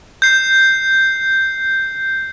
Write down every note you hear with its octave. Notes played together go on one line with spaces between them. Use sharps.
G6 C7